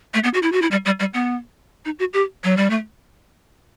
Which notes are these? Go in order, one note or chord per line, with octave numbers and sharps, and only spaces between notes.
A3
B3
F#4
E4
F#4
E4
G3
G3
G3
B3
D#4
F#4
G4
F#3
G3
A3